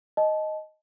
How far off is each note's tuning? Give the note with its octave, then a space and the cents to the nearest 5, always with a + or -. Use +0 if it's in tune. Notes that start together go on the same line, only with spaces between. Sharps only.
D#5 +0 A5 -25